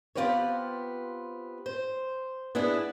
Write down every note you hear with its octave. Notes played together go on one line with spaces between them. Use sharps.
B3 C4 F4 G4 B4 C#5
C5
B3 D4 E4 G#4